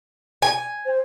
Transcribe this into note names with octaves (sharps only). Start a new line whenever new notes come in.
G#5
C5